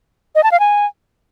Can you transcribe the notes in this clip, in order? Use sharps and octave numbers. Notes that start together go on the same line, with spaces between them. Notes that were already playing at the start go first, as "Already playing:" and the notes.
D#5
A5
F5
G#5